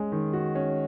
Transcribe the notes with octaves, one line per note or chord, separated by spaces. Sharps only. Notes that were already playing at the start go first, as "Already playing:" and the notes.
Already playing: G#3 C#4
D#3
F#4
C#4